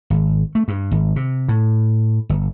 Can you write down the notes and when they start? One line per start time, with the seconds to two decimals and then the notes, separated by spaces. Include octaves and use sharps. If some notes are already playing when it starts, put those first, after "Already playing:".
0.10 G#1
0.55 A3
0.68 G2
0.91 G#1
1.16 C3
1.48 A2
2.29 G1